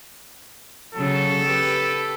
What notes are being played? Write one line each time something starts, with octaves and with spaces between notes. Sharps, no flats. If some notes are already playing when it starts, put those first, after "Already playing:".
C#3 F#3 A4
G4 B4